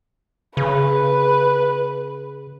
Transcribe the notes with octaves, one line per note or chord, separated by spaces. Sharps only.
C#3 B4